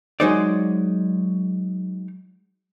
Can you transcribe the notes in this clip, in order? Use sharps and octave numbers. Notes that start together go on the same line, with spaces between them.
F#3 G#3 D#4 C5 D5